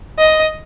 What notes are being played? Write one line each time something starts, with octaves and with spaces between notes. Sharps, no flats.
D#5